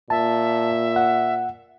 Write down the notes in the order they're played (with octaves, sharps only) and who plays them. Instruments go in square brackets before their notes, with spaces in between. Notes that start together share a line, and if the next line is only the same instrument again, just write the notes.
[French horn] A#2 [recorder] E5 [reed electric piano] A5
[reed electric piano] F#5